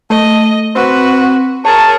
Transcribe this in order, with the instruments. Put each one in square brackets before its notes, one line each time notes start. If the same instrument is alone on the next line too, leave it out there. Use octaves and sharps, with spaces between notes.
[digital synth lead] A3 [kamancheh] D#5
[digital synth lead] C4 [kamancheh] F#4 B4
[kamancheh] G#4 A#4 [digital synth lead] C#5 [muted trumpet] A5